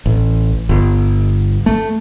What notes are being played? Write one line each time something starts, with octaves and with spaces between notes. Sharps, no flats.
A1
G1
A3